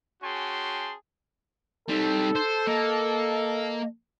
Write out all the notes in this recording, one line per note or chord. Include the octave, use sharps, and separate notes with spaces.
C#4 F#4 G#4 G5 A5 C6
G3 C4 D#4 A4
C5
A#3 D#5